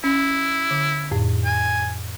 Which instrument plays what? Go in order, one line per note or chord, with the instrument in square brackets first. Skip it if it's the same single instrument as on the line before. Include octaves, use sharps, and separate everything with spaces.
[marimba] C#4 [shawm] E4
[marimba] D3
F2 A2
[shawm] G#5